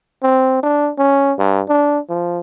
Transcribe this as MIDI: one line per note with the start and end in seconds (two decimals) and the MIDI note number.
0.23 0.60 60
0.63 0.90 62
0.98 1.33 61
1.38 1.62 43
1.68 1.99 62
2.09 2.40 53